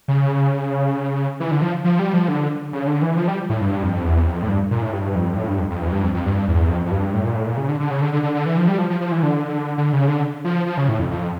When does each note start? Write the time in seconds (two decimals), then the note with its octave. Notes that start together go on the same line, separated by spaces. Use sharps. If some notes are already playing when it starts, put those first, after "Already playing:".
0.08 C#3
1.40 E3
1.51 D3
1.62 F3
1.84 F3
1.99 G3
2.14 F3
2.28 D3
2.73 C#3
2.87 D3
3.02 E3
3.16 F3
3.28 G3
3.49 A2
3.61 G2
3.83 F2
4.05 E2
4.27 F2
4.42 A2
4.48 G2
4.71 A#2
4.82 A2
4.93 G2
5.15 F2
5.33 G2
5.37 A2
5.48 G2
5.59 F2
5.70 F2
5.82 E2
5.87 F2
5.92 G2
6.03 F2
6.14 F2
6.25 G2
6.48 E2
6.69 F2
6.86 F2
6.91 G2
7.14 A2
7.25 A#2
7.35 A2
7.47 A#2
7.57 C#3
7.69 D3
7.80 D3
7.91 C#3
8.02 D3
8.13 D3
8.23 D3
8.35 D3
8.46 E3
8.57 F3
8.68 G3
8.78 F3
8.90 F3
9.01 F3
9.12 E3
9.23 D3
9.78 D3
9.93 C#3
10.08 D3
10.44 F3
10.66 F3
10.77 C#3
10.89 A2
10.99 F2
11.11 F2